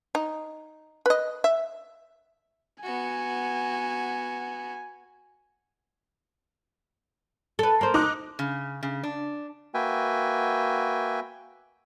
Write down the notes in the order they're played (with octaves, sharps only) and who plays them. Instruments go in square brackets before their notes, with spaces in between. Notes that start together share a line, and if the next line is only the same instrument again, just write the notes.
[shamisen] D#4
B4 D#5
E5
[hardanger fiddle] B3 F#4 [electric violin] G#5
[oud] A4 B4
A#3 C5
[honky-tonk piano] D#4 D6 F#6
[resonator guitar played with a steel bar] C#3
C#3
D4
[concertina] A#3 F#4 B4 E5 G5 G#5